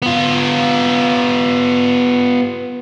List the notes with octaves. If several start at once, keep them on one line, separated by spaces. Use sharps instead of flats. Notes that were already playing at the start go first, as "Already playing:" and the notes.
B3 F4